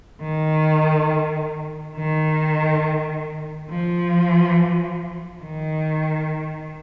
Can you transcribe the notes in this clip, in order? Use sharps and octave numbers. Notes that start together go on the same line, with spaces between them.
D#3
D#3
F3
D#3